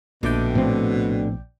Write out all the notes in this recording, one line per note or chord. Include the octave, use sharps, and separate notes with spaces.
A#1 B2 D3 A3 D5 G5
A2 F3 C4